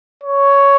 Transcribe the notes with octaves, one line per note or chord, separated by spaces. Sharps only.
C#5